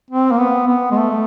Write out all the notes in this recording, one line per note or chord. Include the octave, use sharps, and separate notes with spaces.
C4
A#3
B3
B3
G#3
A3